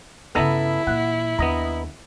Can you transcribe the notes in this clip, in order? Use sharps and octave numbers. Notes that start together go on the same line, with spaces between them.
G2 C#3 B3 E4 A4 A#5
A#2 E3 F#5
D#2 B3 D4 D#5 A#5